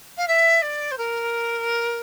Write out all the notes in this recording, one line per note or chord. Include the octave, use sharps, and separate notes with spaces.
F5
E5
D5
C5
A#4